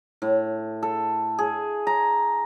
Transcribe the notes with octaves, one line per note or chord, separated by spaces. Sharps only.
A2
A4
G#4
A#5